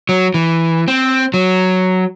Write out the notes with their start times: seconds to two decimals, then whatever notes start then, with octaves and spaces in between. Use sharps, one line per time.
0.09 F#3
0.34 E3
0.88 C4
1.34 F#3